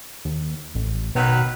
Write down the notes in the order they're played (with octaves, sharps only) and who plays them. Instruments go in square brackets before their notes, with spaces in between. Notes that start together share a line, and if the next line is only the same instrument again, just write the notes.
[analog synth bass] D#2
A1
[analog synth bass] B2 [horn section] D#3 F#3 B4